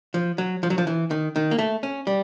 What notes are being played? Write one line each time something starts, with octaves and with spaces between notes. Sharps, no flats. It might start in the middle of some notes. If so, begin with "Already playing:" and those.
F3
F#3
F3
F#3
F3
E3
D#3
D#3
A#3
A3
C#4
G3